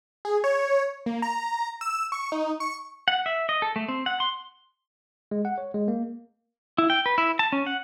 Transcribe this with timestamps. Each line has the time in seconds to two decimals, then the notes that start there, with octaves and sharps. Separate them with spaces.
0.25 G#4
0.44 C#5
1.06 A#3
1.22 A#5
1.81 E6
2.12 C#6
2.32 D#4
2.60 C#6
3.08 F#5
3.26 E5
3.49 D#5
3.62 A4
3.76 A3
3.88 C4
4.06 F#5
4.20 C6
5.31 G#3
5.45 F#5
5.58 C#5
5.74 G#3
5.88 A#3
6.78 E4
6.90 G5
7.06 B4
7.18 E4
7.39 A5
7.52 C#4
7.67 F#5